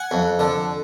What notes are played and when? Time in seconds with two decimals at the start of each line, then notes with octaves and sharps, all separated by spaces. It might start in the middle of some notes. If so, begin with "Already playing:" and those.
Already playing: F#5 G#5
0.11 F2
0.39 D3